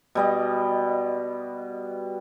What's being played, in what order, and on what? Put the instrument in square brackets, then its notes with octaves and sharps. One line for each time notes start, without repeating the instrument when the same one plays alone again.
[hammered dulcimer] B2 G3 D#5